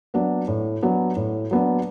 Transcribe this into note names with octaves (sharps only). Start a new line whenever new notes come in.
F#3 B3 D4
A2
F#3 B3 D4
A2
F#3 B3 D4